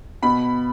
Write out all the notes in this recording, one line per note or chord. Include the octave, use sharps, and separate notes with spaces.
B2 B5